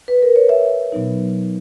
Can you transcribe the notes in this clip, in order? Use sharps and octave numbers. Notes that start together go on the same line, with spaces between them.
B4
A#4
C#5
E5
B2 F#3 B3 D#4